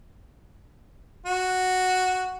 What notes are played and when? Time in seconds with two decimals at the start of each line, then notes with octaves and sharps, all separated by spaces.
1.26 F#4